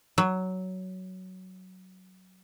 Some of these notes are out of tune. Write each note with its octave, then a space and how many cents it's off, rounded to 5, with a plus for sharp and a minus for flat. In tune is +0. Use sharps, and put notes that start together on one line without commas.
F#3 +10